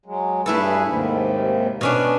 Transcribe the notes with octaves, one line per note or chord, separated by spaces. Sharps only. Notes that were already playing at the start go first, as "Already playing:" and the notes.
F#3 G#3
G2 A3 E4 G#4 A4 B4
D#2 G#2 C3
B2 C#4 D4